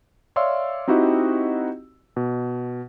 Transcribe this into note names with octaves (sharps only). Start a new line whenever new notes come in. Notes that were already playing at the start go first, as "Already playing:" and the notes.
C#5 D5 E5 F5 C6 E6
C4 D#4 E4 F#4 G4 D#5
B2